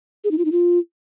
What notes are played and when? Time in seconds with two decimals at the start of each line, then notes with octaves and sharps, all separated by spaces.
0.24 G#4
0.31 D#4
0.38 F4
0.45 D#4
0.52 F4